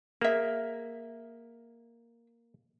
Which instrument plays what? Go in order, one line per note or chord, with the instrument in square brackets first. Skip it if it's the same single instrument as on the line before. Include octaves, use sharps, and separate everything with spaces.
[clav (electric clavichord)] A#3 [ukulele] G#4 E5